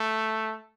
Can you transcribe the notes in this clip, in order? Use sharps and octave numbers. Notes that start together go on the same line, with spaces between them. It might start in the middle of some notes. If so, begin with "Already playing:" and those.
Already playing: A3